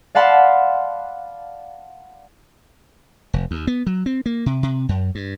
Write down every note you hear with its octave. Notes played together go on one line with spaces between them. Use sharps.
D5 F5 F#5 A5 B5 C6
F1
D#2
B3
F#3
C4
A#3
C3
C3
F#2
G2